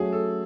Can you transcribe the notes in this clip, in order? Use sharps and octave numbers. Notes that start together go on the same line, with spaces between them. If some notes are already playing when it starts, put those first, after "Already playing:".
Already playing: F#3 A3 C#4 F#4 G#4
A4